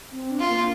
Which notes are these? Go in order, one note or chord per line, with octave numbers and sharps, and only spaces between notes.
C4
D4
F4
A#3